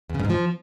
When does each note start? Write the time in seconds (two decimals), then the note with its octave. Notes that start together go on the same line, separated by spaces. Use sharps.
0.10 E2
0.15 C#3
0.20 G2
0.25 G#2
0.30 F3